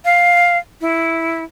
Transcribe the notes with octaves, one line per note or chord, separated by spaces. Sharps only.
F5
E4